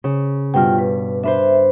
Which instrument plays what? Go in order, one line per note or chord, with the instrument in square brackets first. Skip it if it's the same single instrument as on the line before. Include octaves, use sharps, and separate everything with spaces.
[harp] C#3
[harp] G2 B2 [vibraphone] F4 G5
[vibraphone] B4
[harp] D4 B4 C5 [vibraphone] E5